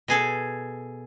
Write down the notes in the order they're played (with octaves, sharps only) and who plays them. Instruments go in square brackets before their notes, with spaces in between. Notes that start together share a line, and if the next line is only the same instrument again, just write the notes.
[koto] B2 G#4 A4